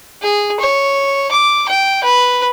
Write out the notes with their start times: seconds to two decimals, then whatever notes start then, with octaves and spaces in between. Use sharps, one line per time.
0.22 G#4
0.60 C#5
1.31 D6
1.68 G5
2.04 B4